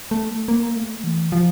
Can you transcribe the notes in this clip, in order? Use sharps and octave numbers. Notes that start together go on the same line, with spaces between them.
A3
A#3
A3
E3
F3